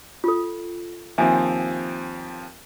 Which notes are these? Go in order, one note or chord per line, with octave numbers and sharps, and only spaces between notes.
F4 A4
D#2 F3 C4 E5 G#5